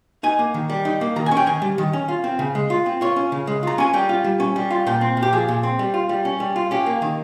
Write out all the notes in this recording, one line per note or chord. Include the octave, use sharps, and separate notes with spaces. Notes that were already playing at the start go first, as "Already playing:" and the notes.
D#4 G#5
A#3
D#3
G3
D#4
A#3
D#3 A#5
G#5
C#4
G5
D#3 G#5
G3
D#3
C#4
F4
C4
C#3
G#3
F4
C4
F4 C#5
C#4
C#3
G#3
F4 A#5
C#4 G#5
G3 G5
F4
G3
C#4
G3
F4
A#2 G5
C4
A#2
G4
F3 G#4
A#2
C4
G3
F4
G3
C#4
G3
F4
C#4 G4
A#3
D#3